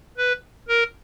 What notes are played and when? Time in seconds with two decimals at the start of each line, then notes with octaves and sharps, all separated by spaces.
0.18 B4
0.68 A#4